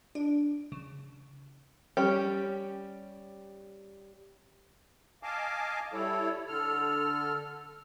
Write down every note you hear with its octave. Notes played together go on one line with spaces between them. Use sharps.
D4
C#3
G3 C#4 G4
D#5 F5 G#5 A5 D6
G3 E4 A4 C#5
D3 A4 F6